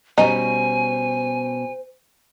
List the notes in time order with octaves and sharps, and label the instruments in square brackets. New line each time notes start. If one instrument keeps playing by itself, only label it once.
[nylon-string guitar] B2 G3 C#4 [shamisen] D#4 [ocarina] C5 [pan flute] G#5